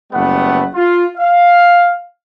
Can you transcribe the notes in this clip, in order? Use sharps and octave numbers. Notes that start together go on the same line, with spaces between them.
F#1 G3 A3 B3 F#5
F4
F5